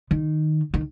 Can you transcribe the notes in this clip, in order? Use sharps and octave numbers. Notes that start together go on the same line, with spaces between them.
D#3
D#3